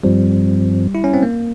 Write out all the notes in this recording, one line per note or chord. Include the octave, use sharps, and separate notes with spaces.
G2 F3 G3 C4
E4
C#4
C4
A#3